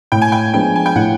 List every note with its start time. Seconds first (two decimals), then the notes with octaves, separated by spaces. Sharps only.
0.12 A2 G5
0.22 G#5
0.32 G5
0.53 F3 G#3 B3 D4 G5
0.76 G#5
0.86 G5
0.95 A2 F#5